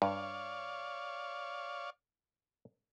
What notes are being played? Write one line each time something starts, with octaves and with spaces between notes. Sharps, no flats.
G2 C#5 D5 F5